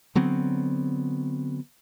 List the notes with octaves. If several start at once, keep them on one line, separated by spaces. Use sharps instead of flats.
D3 F#3 B3 C4